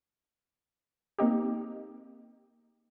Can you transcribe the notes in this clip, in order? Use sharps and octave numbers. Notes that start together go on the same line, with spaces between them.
A#3 C4 D#4 G4